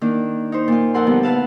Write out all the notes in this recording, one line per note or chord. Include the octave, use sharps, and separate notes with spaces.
D#3 A#3 D4
D#4 C5
A#2 F4
F2 A#4 F#5 C6
D3 F3 G3 B3
B4 F5 F#5 A5